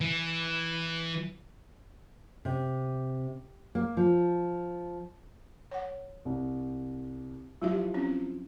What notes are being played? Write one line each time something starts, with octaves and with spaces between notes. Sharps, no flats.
E3
C3
A#3
F3
C#5 F#5
C2
F3 F#3 E4 G4 E5
C4 C#4